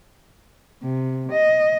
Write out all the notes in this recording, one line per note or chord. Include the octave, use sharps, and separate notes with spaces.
C3
D#5